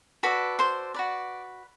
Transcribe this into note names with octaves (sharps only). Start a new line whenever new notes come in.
F#4 A4 B4 D5 B5
C5 C6
F#4 B4 D5